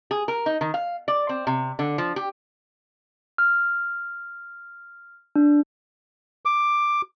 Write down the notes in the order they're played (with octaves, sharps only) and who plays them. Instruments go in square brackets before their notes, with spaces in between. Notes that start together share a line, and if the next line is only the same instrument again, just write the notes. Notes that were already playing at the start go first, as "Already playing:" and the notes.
[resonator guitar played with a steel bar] G#4
A#4
D#4
D#3
F5
D5
C4
C3
D3
F3
G4
[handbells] F6
D4
[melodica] D6